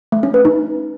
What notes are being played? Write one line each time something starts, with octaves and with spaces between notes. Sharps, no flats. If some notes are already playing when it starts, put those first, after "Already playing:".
A3
C#4
B4
D#4